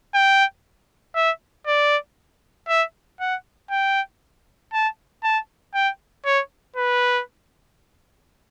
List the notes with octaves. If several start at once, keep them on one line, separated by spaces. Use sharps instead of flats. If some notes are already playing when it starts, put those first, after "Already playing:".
G5
E5
D5
E5
F#5
G5
A5
A5
G5
C#5
B4